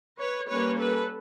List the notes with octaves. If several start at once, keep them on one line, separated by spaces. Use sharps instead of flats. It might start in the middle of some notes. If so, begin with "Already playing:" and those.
B4 C#5
G3 A#3 C#4 B4 C#5
A4 B4